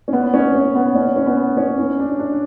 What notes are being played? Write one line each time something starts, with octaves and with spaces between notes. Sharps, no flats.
C#4
B3
C#4
C#4
B3
C#4
C#4
B3
C#4
C#4
D4
D4